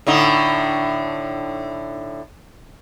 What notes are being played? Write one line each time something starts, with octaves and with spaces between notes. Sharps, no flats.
A2 D3 D#4